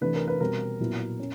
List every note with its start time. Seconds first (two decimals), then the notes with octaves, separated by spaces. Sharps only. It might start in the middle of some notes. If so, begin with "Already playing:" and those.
0.01 C3 E3 A3 D4 B4
0.15 A#4
0.28 B4
0.40 B2 G3 C4 A#4
0.80 A#2 F#3 B3 E4
1.20 C#4